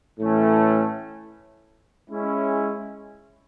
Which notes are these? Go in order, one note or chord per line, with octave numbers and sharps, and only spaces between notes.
A2 E3 A3 C#4
G#3 C#4 E4